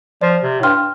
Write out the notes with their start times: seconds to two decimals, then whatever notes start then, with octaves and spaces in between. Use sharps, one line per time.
0.21 F3 D5
0.43 C3
0.60 A2
0.63 G2 G5 C6 F6